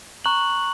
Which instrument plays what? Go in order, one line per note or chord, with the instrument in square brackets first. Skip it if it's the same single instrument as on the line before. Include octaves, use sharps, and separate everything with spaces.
[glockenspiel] A#5 C#6 F#6 F#7